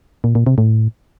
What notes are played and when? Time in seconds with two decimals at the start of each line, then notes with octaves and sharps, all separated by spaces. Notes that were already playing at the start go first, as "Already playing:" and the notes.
0.24 A#2
0.35 A#2
0.47 C3
0.58 A2